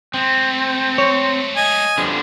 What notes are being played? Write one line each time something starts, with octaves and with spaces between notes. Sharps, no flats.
G#3 A3 C4
C#5
D#5 G#5
F2 D3 F3 G3 D4